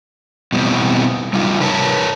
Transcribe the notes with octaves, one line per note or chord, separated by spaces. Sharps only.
B2 E3 G3 B3 C4
C3 G3 D#4 F4
A#4 B4 C#5 A5